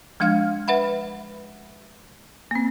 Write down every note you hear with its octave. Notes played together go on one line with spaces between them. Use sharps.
F3 G#3 D4 F5 F6 G#6
B4 E5 F#5 B5
A#3 C4